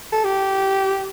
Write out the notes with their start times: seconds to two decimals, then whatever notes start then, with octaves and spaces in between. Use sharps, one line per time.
0.12 A4
0.24 G4